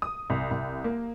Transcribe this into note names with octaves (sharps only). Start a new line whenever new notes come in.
D#6
C2
C2
A#3